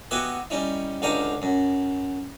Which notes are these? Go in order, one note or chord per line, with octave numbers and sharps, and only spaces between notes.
B3 F#4 G4 D#5 E5 G#5
G3 C#4 D#4 E4
C#2 D3 D#4 G4 F5 A#5
F#2